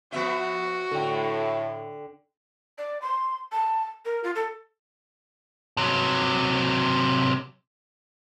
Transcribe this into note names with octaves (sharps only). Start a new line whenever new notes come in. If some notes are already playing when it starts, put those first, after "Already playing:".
F3 B3 F#4 E5
A2 D3 A4 G5
D5
C6
A5
A#4
F4
A4
C3 F#3